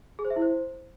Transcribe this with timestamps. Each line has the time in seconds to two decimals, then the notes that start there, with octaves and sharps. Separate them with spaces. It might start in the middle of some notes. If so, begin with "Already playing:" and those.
0.19 G#4
0.25 C5
0.30 E5
0.36 E4
0.42 C5